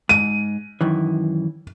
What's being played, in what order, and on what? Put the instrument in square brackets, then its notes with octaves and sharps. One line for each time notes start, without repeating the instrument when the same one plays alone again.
[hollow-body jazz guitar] G#2 [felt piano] D#7
[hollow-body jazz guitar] F#2 D#3 E3